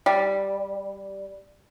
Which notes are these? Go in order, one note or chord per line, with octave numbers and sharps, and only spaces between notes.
G3